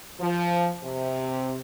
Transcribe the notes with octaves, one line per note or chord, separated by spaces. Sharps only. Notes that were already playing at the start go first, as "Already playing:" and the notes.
F3
C3